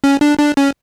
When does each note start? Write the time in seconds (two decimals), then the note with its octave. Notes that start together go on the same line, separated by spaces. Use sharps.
0.04 C#4
0.21 D4
0.39 D4
0.57 C#4